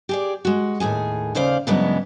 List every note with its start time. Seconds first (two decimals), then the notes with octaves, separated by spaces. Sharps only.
0.09 G4 G#4 D5
0.45 G#3 F#4
0.80 D#2 A2 G#4 G#5
1.35 D#2 C#3 C5 D5 F5
1.67 G2 C#3 E3 F#3 G#3 B3